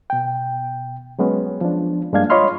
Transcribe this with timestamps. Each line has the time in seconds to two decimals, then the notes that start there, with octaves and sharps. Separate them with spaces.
0.10 B2 G5
1.19 F#3 G#3 B3 C#4
1.61 F3 D4
2.13 G2 G#3 A#3 D4 F5 G#6
2.30 F4 C#5 D#5 B5 C6 F6